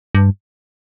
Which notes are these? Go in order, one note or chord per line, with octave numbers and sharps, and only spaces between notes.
G2